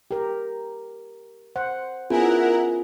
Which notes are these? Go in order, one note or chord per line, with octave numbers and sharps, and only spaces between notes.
G4 A#4
C5 F#5
B3 C#4 E4 F4 G#4 A#4 F#5 G#5